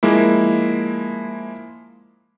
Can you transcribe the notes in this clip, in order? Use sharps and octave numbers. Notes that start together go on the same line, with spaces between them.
F3 G#3 A#3 E4